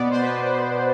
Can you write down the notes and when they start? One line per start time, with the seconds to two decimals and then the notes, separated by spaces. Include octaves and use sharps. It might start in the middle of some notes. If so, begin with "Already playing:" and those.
Already playing: B2 B3 D5
0.10 C5
0.21 B4